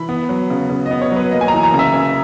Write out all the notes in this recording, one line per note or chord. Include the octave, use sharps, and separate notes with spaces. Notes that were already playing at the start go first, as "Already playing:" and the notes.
Already playing: E3 B5
B3
F#3
C#3
C#3
D#5
B3
C#5
F#3 B4
A#3 D#5
G#5
A#5
E3
A#5
C#3
E5
C#3